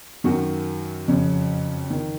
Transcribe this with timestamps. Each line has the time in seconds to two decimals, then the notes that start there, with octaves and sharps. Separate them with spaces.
0.24 F#2 D#3 F#4
1.08 F2 C#3
1.90 D#3